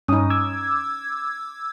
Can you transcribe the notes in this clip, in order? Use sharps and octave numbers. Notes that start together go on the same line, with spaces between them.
G2 C#4 D#4 D#6
D6 E6 G#6